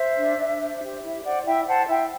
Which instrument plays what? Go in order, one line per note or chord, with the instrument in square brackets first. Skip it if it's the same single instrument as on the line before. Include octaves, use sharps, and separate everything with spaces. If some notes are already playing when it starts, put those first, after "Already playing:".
Already playing: [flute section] C5 E5
D4
D4
C5
G4
E4 E5
C5 D5 F#5
E4 E5 G5
C5 F#5 A5
E4 E5 G5